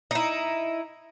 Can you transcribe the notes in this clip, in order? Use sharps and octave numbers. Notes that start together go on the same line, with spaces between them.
D#4 E4